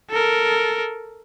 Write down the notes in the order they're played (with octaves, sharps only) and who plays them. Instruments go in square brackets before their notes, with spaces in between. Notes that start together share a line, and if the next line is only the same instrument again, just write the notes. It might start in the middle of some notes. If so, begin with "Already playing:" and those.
[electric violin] A4 A#4